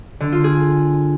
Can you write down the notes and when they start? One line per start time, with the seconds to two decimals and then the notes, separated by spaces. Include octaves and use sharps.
0.20 D3
0.32 F4
0.44 G#4